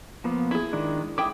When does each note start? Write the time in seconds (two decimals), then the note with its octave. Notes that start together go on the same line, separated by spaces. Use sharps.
0.24 F3 A#3 B3
0.51 E4 G#4
0.73 D#3 G#3 D4
1.18 E4 G5 D6 D#6